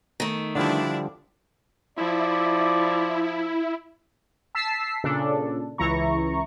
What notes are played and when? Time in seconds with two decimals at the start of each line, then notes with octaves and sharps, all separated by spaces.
0.20 D#3 A3
0.55 D3 F3 G3 D4 E4
1.98 F3 E4 D5
4.55 A5 E6 B6 C7
5.04 A#2 C#3 D4 A4
5.78 C#2 E3 E4 A#5 C#6